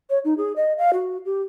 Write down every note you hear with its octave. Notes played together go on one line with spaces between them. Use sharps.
C#5
D#4
G#4
D#5
F5
F#4
G4